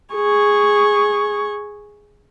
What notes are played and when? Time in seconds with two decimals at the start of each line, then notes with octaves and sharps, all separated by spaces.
0.15 G#4 C#6